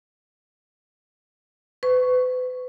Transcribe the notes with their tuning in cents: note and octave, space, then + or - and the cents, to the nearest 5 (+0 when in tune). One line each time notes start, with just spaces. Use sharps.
B4 +35 C#6 +0